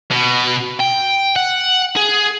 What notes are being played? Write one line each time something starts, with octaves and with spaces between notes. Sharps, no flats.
B2
G5
F#5
G#4